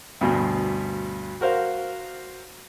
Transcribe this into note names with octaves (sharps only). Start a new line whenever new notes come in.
D2 G2 B2
F#4 A#4 C5 F5